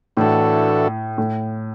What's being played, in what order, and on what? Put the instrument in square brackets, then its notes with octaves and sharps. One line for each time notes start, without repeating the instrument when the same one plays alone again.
[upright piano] A2 [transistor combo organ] E3 A3 D4 F#4 A4
[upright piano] A2